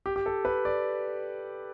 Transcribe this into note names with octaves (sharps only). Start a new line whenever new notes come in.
G4
G4
A4
B4
D5